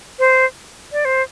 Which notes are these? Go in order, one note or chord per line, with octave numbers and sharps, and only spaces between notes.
C5
D5
C5